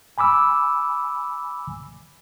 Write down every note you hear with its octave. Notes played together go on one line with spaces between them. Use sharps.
G#5 B5 D6 E6